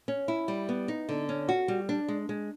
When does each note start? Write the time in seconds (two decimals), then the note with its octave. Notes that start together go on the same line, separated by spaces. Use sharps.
0.08 C#4
0.28 E4
0.48 G3
0.69 B3
0.88 D#4
1.09 D3
1.29 C#4
1.49 F#4
1.68 G3
1.89 D4
2.08 G#3
2.29 G#3